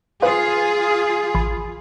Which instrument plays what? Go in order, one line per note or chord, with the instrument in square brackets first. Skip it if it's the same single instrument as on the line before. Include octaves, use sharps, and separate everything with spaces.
[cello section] F4 G#4 [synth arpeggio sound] B4 C5 F5
[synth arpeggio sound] A1 B5